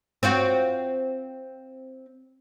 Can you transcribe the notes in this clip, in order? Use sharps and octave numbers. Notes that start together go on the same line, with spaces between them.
C4 F4 F#4